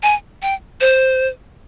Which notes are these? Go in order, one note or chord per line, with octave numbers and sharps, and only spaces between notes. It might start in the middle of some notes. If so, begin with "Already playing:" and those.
G#5
G5
C5